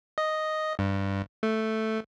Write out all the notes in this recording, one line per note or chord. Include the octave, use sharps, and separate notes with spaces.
D#5
G2
A3